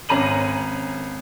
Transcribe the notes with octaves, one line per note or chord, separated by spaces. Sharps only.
G#1 C#4 A#5 D#7 F#7